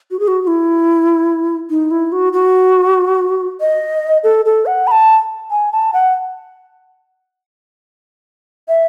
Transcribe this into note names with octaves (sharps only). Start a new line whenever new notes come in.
F#4
G#4
F#4
F#4
E4
D#4
E4
F#4
F#4
D#5
A4
A4
F#5
B5
A5
G#5
A5
F#5
E5